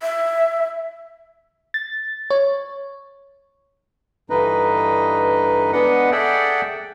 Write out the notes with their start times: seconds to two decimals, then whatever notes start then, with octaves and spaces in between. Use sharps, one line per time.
0.02 E5
1.74 A6
2.30 C#5
4.30 G2 D3 E3 D#4 B4 D#5
5.72 G#3 B3 D4 B4 D#5 F#5
6.12 G#4 A4 D5 E5 F#5 G5